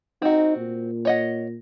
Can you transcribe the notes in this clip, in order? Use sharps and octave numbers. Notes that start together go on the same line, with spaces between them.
C4 D#4 F#4
A#2
C#5 D#5 F#5